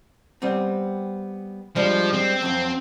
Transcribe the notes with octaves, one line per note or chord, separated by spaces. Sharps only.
G3 B3 C4
F3 G3 G#3 D4
C4
F2 F#3